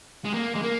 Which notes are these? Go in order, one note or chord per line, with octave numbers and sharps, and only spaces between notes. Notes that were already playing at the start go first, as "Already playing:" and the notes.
G#3
A#3
G#3
A#3